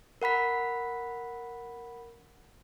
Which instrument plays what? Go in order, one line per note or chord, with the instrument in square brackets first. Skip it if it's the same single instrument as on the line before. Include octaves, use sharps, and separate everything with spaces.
[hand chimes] A#4 F#5 B5 B6